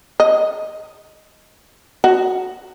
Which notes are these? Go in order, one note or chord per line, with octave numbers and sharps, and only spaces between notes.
D#5
F#4